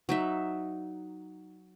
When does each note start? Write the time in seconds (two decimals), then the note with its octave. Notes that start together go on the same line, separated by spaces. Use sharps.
0.09 F#3 D#4 E5